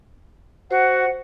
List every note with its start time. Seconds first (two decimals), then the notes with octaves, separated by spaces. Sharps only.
0.71 F#4 C5 F#5